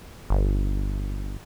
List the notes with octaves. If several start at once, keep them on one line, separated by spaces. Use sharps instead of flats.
G1